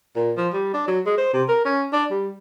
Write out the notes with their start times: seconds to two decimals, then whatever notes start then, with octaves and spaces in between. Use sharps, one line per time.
0.16 A#2
0.37 F3
0.53 G3
0.74 D4
0.88 F#3
1.06 G#3
1.18 C5
1.33 C3
1.48 A#4
1.65 C#4
1.93 D4
2.11 G3